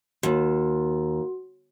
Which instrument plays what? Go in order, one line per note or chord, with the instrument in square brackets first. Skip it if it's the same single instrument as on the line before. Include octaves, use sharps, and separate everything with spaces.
[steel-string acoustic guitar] D#2 [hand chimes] F#4